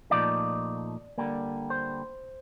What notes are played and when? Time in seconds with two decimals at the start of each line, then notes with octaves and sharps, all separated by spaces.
0.11 A#2 F3 A3 D#4 D5
1.18 D3 G3 A#3
1.70 C5